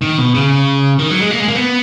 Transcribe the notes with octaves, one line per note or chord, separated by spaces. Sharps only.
D#3
B2
C#3
D#3
F#3
G#3
A#3
G#3
A#3
B3